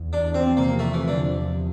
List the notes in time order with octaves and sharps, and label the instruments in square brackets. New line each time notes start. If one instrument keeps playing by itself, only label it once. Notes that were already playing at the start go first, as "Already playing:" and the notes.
Already playing: [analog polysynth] E2
[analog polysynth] E2 [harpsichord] D4
[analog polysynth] F3 [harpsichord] C4
[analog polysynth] C3 [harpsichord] A#3
[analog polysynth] C3 [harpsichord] A3
[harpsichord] E3
[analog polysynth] F3
[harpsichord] D3